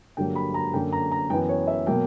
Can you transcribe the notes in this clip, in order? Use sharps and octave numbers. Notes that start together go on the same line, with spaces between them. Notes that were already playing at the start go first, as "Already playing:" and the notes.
G2 D3 F#3 A#3 G5
B5
A#5
F#2 D3 A#3 G5
A#5
A#5
F#2 E3 B3 G5
C#5
E5
B2 F#3 A#3 G5